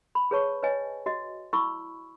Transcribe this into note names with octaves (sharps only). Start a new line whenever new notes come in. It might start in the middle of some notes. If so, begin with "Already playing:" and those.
B5
G#4 B4 C#5 A5 C#6
B4 C#5 D#5 G#5
F#4 D#5
E4 B5 C#6 E6